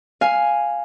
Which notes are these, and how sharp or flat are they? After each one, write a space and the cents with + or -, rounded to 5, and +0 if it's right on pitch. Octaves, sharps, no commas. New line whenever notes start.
F5 +0 G#5 +0